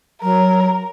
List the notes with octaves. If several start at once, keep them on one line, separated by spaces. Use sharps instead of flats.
F#3 A#4